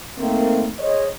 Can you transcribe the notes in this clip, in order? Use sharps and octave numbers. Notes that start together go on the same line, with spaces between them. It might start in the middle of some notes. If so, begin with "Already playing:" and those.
D#3 A3 A#3 C4
G#4 C5 C#5 D#5